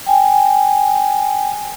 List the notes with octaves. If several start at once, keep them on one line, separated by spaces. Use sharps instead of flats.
G5 G#5